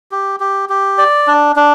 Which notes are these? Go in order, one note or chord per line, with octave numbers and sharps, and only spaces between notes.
G4
G4
G4
D5
D4
D4